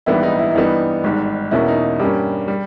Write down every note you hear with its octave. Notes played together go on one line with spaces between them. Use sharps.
A#1 G#2 E3 G3 B3 E4
D#4
E4
E4
G2 E3 G3 B3 D#4
G#1 G#2 G3
E2 B2 A#3 C#4 E4
D#4
G2 G3 A#3 C#4 G4
G3